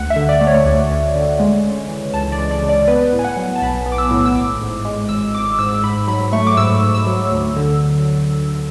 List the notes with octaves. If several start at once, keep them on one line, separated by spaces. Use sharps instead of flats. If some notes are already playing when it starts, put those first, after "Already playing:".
Already playing: D2 F#5
E5
D3
D5
A3
C#5
D2
D2
D3
G#3
C#3
E3
C#2 A5
D5
G#3
D5
C#3
D5
B3 B4
A2
G#5
F#5
F#3
A5
B1 B5
B3
D6
E6
A2
E6
G#1 D6
G#2
G#3
G#1 E6
G#1 D6
G#2 E6
G#2 B5
F#3 B5
A3 C#6
D6
G#2 E6
G#2
E6
F#3
D2
D3